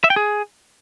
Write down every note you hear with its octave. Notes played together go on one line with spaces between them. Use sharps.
E5
G5
G#4